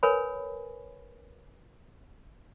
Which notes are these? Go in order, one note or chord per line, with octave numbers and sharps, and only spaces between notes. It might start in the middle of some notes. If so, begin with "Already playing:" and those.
A#4 B4 C#5 G#5 B5